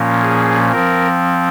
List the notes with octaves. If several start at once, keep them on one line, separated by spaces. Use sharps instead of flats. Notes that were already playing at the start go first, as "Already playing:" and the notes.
Already playing: A#2 F3 A#3 C#4
G#4
F3 C4 A#4